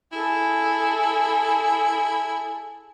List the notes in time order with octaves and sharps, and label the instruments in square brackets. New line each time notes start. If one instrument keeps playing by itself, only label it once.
[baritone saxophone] E4 [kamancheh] G#4 A4